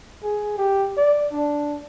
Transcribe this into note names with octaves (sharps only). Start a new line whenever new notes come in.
G#4
G4
D5
D4